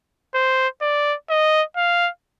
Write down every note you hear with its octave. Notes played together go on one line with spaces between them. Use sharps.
C5
D5
D#5
F5